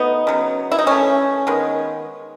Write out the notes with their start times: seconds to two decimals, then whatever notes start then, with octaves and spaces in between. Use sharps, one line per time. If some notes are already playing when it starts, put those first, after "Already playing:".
Already playing: B2 A3 B3 D#4
0.27 C#3 F#3 B3
0.72 E4
0.79 D#4
0.87 E3 A3 C#4
1.47 D#3 G#3 B3